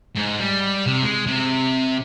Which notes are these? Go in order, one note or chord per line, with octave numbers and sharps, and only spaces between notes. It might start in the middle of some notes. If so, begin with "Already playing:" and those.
G#2
G3
C3
G#3
C3